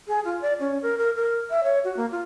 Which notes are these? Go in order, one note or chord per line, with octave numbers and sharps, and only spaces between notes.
G#4
F4
D5
C#4
A#4
A#4
A#4
E5
C#5
F#4
A#3
F4